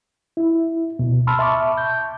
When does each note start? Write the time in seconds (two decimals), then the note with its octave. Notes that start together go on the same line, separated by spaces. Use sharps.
0.37 E4
0.99 D2 B2
1.27 A5 B5 C6 E6 F6
1.39 E5 A5 C#6 D6
1.78 G6